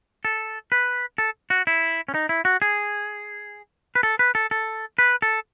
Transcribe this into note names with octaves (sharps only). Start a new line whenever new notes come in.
A4
B4
A4
F#4
E4
C#4
D#4
E4
F#4
G#4
B4
A4
B4
A4
A4
B4
A4